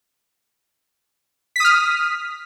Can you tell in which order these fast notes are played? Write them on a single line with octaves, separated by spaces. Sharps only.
B6 D#6 F6